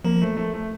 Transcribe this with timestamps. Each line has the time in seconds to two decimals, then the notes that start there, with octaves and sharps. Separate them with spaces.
0.05 F3 A#3
0.22 A3
0.37 A3
0.54 A3